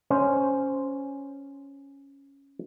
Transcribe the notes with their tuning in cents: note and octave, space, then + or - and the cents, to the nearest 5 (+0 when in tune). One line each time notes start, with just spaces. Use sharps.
C#4 +0 C5 +0